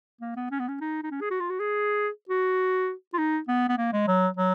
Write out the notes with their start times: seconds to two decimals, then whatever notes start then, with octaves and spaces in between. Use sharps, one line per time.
0.21 A#3
0.36 B3
0.51 C#4
0.60 B3
0.68 C#4
0.81 D#4
1.03 D#4
1.11 C#4
1.21 G#4
1.31 F#4
1.40 F4
1.50 F#4
1.60 G#4
2.29 F#4
3.14 F4
3.18 D#4
3.48 B3
3.69 B3
3.78 A#3
3.93 G#3
4.07 F#3
4.37 F#3